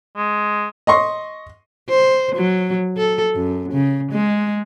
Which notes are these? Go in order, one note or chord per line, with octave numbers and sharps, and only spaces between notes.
G#3
D#5 C6 C#6
C5
F#3
A4
F#2
C#3
G#3